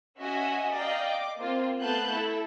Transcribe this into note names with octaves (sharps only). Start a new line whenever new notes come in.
C#4 F#4 D#5 E5 F#5 G#5
D5 D#5 F5 G5 A#5
D6
A#3 C4 F4
A3 B3 F5 A5 F#6 G6
E4 A4